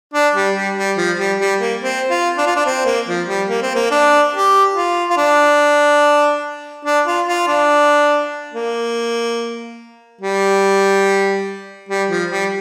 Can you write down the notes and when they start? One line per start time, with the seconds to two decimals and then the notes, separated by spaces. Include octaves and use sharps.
0.14 D4
0.35 G3
0.56 G3
0.77 G3
0.97 F3
1.18 G3
1.40 G3
1.60 A#3
1.82 C4
2.10 F4
2.38 D4
2.47 F4
2.56 D4
2.66 C4
2.86 A#3
3.08 F3
3.28 G3
3.49 A#3
3.63 C4
3.75 A#3
3.91 D4
4.34 G4
4.75 F4
5.10 F4
5.18 D4
6.85 D4
7.07 F4
7.28 F4
7.48 D4
8.54 A#3
10.21 G3
11.89 G3
12.10 F3
12.31 G3